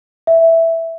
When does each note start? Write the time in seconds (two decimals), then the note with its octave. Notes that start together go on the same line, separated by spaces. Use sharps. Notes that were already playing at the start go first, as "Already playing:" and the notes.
0.27 E5